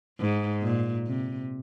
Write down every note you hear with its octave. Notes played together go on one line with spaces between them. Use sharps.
G#2
A#2
C3